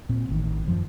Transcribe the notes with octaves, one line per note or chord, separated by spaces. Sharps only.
A#2 C4
A1 D#3
F#2 F3